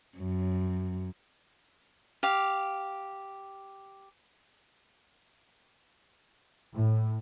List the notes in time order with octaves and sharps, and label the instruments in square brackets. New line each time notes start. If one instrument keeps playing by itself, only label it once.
[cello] F#2
[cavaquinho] G4 F5
[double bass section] A2